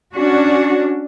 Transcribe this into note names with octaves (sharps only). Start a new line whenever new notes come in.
C#4 D4 F#4